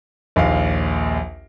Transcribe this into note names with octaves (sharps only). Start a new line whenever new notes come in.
A#1 D#2 F5